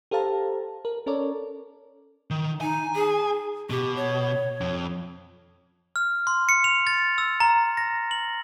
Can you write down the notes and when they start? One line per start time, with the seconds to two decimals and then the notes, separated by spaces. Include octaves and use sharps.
0.11 G4 A4 C5 F5 A5 A#5
0.85 A#4
1.06 C#4 A4 A#4 C#5 D5
2.30 D#3
2.61 D#4 G#5
2.95 G#4
3.70 B2 G4
3.96 C#5
4.61 F2
5.96 F6
6.27 C6
6.49 C#7
6.64 F7
6.87 A6
7.18 E6
7.40 A#5
7.77 A#6
8.11 F#7